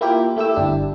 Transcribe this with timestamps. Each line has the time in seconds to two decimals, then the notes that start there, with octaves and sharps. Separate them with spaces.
0.01 A#3 E4 F4 G4
0.36 A3 E4 G4 E6
0.54 G1 D4 E4 G4